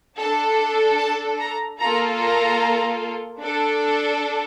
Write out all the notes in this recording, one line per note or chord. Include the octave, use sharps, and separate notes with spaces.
D4 A4 A5
A5
A#5
A#3 F4 A4 A#5
A#5
D4 A4